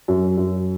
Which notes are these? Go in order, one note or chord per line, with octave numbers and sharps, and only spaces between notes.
F#2
F#2